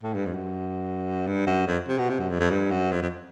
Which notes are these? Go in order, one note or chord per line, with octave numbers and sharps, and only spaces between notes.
A2
G2
F2
F#2
G2
F#2
F2
C3
B2
C3
F#2
F2
F2
G2
F#2
F2
F2